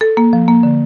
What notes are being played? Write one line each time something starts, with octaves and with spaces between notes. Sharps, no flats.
A4
A#3
F3
A#3
D3